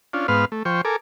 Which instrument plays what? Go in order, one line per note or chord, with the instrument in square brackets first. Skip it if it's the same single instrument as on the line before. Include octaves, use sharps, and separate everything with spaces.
[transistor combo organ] C#4 D4 F4
G#2 B3 B4 F5 C6 F6
A3
F3 C5 G5 C#6
A4 A#4 G#5 D6